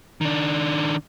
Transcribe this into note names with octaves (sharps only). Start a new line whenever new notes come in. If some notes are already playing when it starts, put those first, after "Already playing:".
D#3 D4